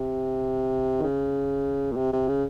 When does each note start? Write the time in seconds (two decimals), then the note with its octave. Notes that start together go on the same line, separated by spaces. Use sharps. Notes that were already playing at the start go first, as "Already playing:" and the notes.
Already playing: C3
1.00 D#3
1.03 C#3
1.92 A#2
1.97 C3
2.13 C3
2.28 C#3